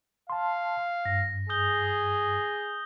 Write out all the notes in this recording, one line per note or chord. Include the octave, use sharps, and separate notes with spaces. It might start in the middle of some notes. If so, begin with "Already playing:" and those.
F5 A5 C6
G2 A#6
G#4 D#6 G6 G7